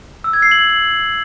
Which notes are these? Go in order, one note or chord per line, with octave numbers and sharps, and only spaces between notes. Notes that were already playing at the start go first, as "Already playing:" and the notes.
E6
G#6
C7
F#7